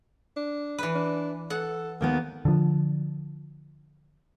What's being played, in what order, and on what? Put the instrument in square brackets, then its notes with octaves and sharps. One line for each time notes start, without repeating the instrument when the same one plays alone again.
[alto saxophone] D4
[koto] E3 B4
[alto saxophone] D4
[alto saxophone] A4 [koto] F#5
[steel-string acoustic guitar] D#2 D#3 B3 [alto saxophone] A#3
[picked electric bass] D3 F3